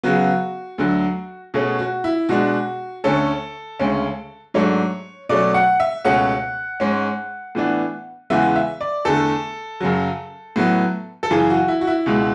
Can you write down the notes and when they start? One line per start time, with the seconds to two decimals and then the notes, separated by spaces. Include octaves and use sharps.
0.03 C#3 F#3 B3 F#4
0.78 D2 D3 F#3
1.54 B2 A3 C#4 G#4
1.79 F#4
2.04 E4
2.29 B2 G#3 D4 F#4
3.04 D2 D3 A3 C#4 A4
3.80 D2 C#3 G#3 C#4
4.54 G#2 F#3 A3 D4 C#5
5.29 B2 F#3 A3 C#4 D5
5.54 F#5
5.80 E5
6.05 C#2 B2 A3 C#4 F#5
6.80 G#2 G#3 C#4
7.55 A2 E3 B3 D4
8.30 E2 C#3 E3 G#3 B3 E5
8.56 E5
8.81 D5
9.05 E2 D3 A3 A4
9.81 F#2 C#3 F#3
10.56 A2 F#3 B3
11.23 A4
11.31 F#2 C#3 E3 G#4
11.50 F#4
11.68 E4
11.81 F#4
11.87 E4
12.06 C#2 B2 G#3